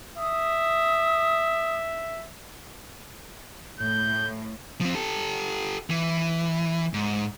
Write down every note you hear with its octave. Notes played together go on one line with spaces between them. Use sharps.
E5 D#6
A2 G6
F3 C4
G4 A4
E3
G#2